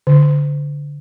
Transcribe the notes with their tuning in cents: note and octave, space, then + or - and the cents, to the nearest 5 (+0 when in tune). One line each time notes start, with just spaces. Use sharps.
D3 -15